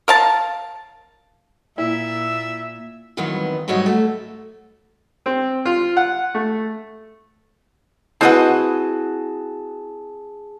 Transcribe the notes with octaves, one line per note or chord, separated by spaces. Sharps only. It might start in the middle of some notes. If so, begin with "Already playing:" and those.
A#4 F5 A5
A#2 E4 E5
F2 D#3 E3 F#3 B3
G#2 F#3 G3 F#4 C#5 D#5
A3
C4
F4
F#5
A3
C4 E4 F#4 G#4 B4 D#5 F#5 A5